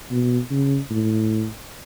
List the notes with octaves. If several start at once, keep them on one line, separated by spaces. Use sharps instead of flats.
B2
C#3
A2